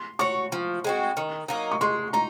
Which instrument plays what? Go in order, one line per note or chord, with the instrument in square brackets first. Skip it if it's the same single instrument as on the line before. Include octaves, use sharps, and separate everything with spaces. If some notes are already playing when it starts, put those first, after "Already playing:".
Already playing: [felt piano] C6
[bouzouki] F#4 C#5 [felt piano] C#6
[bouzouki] F3
G#3 C4 F#4
D#3
F#3 A#3 D#4
[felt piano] C#6
[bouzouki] G#3 [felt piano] C6
[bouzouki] D#4 [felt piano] A#5